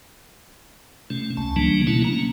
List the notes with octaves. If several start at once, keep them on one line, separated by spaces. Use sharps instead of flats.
C3 A3 C#4
C#2 A5
C#3 E3 F#3 G3 A#3 D4
B2 F#3 A3 A#3 C#4 E4
A#3 C#4 A#5